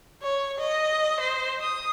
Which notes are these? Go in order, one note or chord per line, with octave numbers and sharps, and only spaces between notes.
C#5
D#5
C5
D#6